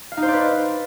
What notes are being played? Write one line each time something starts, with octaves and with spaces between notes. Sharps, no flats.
F5
D#4
C5
D5
B4